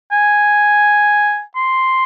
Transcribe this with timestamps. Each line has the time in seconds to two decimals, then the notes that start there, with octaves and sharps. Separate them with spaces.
0.12 G#5
1.56 C6